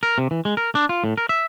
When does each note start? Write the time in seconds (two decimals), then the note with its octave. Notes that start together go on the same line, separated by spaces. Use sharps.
0.03 A#4
0.18 C3
0.31 E3
0.45 G#3
0.57 A#4
0.75 D4
0.89 F4
1.04 A2
1.18 A#4
1.29 E5